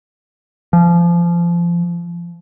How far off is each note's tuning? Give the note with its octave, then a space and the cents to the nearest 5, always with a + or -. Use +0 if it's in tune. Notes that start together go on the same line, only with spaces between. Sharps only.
F3 -25